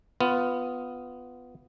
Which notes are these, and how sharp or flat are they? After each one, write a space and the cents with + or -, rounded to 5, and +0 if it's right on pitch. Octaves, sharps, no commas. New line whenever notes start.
B3 +10 F4 +0